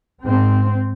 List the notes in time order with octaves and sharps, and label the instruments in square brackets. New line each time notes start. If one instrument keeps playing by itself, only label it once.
[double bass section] G#2 C4